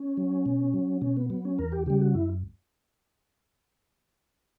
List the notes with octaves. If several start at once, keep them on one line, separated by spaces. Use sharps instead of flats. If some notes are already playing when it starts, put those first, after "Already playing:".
Already playing: C#4
F#3
B2
F#3
B2 C#4
B3
F#3 B3
C#4
E2 A#4
G4
C#3 G3 G4
F#4
F#2 E4